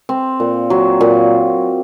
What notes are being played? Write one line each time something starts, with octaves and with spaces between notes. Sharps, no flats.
C4
A#2
F#3
A#2